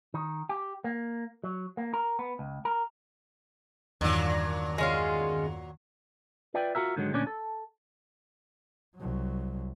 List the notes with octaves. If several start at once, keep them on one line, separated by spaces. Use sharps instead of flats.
D#3
G4
A#3
F#3
A#3
A#4
B3
C#2
A#4
E2 G2 A#2 D#3 F#3 D4
G#3 C#4 F4
F4 B4 D5 E5 G5
F4 F#4 G#4 A#4 E5
G#2 D3 D#3 F#3 G#3
D2 A#2 C#4 D4 D5
A4
C2 F#3